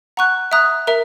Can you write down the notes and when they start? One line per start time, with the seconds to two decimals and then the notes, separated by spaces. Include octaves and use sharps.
0.17 F#5 A#5 C#6 F#6
0.52 E5 A#5 D#6 F#6
0.87 A#4 E5 A#5